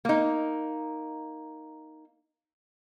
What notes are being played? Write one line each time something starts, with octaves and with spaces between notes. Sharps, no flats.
A#3 D#4